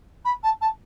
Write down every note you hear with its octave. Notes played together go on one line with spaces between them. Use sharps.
B5
A5
A5